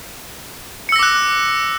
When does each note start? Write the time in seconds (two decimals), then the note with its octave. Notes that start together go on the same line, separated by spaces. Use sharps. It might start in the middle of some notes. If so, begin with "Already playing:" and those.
0.89 C#7
0.92 E6
0.96 A#6
0.99 D6
1.03 F#6